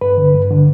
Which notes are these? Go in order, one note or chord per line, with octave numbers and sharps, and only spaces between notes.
G2 B4
D3
G2
D3